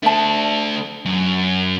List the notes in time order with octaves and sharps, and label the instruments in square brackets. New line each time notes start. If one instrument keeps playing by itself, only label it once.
[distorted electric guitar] A3 D4 [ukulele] E5 A5
[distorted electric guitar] F#2